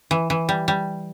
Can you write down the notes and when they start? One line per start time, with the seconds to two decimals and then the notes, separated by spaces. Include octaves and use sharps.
0.11 E3
0.30 E3
0.49 G3
0.68 G3